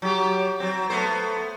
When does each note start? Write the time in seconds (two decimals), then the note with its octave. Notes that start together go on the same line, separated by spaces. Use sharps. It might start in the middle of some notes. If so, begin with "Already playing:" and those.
0.02 F#3 G4
0.60 F#3 C4
0.90 A3 B3 C5